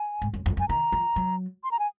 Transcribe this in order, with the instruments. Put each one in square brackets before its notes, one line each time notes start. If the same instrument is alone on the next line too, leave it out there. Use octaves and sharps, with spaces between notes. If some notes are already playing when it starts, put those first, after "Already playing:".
Already playing: [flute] G#5
[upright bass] G#2
F#2
F2
F#2
[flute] G#5
[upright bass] D#3 [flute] A#5
[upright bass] F3
F#3
[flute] C6
A#5
G#5